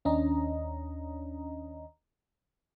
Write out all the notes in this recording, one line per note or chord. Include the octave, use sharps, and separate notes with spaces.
D#2 C#4 D4 D#5 A#5